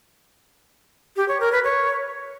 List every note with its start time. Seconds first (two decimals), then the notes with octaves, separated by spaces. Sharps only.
1.16 G4
1.28 C#5
1.40 A#4
1.52 B4
1.64 C#5